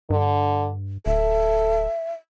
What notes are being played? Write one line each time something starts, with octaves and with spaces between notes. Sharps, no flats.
G2 D3
D1 A4 E5